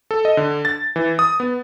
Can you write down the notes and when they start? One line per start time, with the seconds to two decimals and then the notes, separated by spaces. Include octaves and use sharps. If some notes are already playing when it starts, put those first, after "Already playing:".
0.11 A4
0.25 D#5
0.37 D3
0.65 A6
0.96 E3
1.19 D#6
1.40 B3